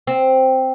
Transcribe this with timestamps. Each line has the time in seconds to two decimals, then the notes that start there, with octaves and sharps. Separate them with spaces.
0.07 C4